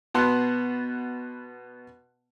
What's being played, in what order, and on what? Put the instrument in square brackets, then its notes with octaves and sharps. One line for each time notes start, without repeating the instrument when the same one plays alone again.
[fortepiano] B2 B3 F#5 A5 C6 F#6